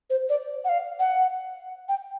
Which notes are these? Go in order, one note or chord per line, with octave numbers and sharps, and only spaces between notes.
C5
D5
F#5
F5
F#5
G5